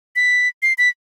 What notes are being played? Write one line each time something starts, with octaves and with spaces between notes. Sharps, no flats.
B6
C7
B6